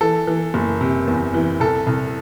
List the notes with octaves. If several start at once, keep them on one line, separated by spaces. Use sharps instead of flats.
E3 A4
E3
F#1
C3
E2
E3
C2 A4
C2